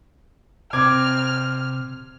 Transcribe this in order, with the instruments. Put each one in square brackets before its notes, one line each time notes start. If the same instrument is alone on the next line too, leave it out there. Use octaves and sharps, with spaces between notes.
[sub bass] C3 [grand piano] C4 D6 G#6 [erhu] F6